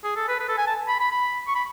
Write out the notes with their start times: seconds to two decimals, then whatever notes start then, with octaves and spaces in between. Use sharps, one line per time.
0.04 G#4
0.16 A4
0.28 B4
0.40 B4
0.48 A4
0.58 G#5
0.67 A5
0.88 B5
1.00 B5
1.11 B5
1.47 C#6
1.55 B5